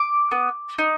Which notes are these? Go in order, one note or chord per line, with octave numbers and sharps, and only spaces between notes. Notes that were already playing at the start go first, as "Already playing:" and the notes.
Already playing: D6
B3
D#4